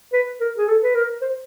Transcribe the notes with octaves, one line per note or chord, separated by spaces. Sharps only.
B4
A#4
G#4
A4
B4
A#4
C5